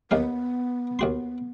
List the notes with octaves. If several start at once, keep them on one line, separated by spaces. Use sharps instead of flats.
D#2 B3 D#4 F5
D#2 F#4 C6